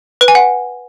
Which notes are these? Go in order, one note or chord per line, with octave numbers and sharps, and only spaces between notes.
B4
G#5
F#5